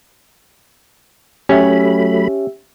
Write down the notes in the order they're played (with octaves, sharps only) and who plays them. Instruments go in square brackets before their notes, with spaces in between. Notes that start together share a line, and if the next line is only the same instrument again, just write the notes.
[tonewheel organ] F#3 A3 B5 [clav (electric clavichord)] C#4 [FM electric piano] G4 E5